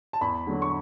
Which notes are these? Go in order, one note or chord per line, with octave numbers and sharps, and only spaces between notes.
A5
E2 B5
D3 F#3
C#6